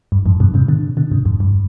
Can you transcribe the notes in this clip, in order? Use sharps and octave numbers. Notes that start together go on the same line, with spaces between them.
G2
F2 G#2
G2 B2
G#2 C3
B2 D3
B2 D3
G#2 C3
F2 G#2
G2